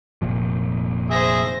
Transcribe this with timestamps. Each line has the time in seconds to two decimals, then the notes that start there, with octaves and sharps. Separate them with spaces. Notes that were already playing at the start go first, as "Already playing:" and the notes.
0.22 F1 A#2 F3
1.11 G#4 C5 E5 A#6